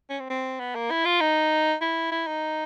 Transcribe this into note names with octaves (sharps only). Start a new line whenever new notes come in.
C#4
C4
C4
B3
A#3
E4
F4
D#4
E4
E4
D#4